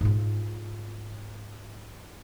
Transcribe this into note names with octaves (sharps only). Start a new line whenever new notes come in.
G#2 F4